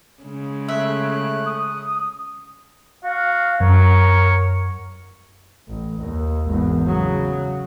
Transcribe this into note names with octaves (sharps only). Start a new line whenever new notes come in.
C#3 G#3
A3 E5 F#6
D#6
F#4 F5
F#2 A#4 C#5
A1
D#2
G#1 E2
C#3 F#3